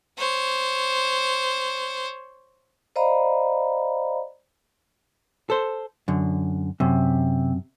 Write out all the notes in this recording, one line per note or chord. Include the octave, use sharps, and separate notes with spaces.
C5 C#5
C5 D5 D#5 F5 A#5 B5
A4 C5
F#2 D3
F#2 C3